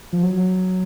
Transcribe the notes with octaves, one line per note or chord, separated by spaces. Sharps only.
F3
F#3